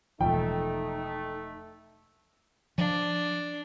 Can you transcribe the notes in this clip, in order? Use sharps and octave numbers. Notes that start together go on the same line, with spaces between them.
E1 C#2 F3 A3 D#4 G5
F3 D4